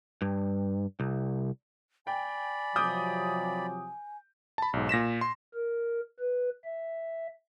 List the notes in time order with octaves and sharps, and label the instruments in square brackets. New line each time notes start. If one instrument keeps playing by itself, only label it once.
[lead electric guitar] G2
C2
[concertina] D5 B5 [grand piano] G5 [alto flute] G#5
[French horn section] C3 F3 F#3 [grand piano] D6 D#6 G6
[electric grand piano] A5 B5
B1 G#2
A#2 A#6 B6 E7
C6
[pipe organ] A#4
B4
E5